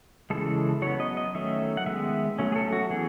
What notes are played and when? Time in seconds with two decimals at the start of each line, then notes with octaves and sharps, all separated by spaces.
0.30 C#3 E3 G#3 A4
0.82 F#3 B3 C#5
1.00 D#5
1.17 D#5
1.35 D#3 F#3 A3 C#4 E5
1.77 F#5
1.86 D#3 G#3 B3 E5
2.39 F#3 A3 C#4
2.52 G#4
2.56 A4
2.72 F#4
2.90 E3 B3 G#4